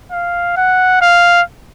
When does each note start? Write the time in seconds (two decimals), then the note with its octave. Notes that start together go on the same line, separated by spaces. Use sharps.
0.12 F5
0.57 F#5
1.01 F5